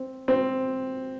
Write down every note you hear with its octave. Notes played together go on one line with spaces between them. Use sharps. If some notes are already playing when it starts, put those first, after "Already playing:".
Already playing: C4
C4